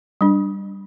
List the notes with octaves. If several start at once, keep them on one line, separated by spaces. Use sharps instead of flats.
G3 D4